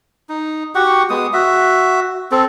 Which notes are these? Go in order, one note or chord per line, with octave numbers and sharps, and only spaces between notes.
D#4
F#4 G4 F#5 C#6
G#3 B3 D#6
F#4 E5
C4 A4